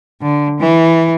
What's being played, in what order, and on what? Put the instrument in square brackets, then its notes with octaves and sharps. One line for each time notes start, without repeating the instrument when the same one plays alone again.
[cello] D3
E3